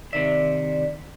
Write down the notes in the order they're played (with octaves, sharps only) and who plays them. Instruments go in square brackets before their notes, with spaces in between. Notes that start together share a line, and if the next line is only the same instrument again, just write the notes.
[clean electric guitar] C3 D#3 E5 [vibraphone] D5